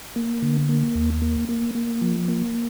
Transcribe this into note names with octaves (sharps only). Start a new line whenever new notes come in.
A#3
D3
A#3
D#2
A#3
A#3
A#3
F3
A#3